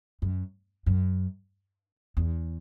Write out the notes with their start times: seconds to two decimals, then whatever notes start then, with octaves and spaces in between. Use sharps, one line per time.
0.22 F#2
0.86 F#2
2.17 E2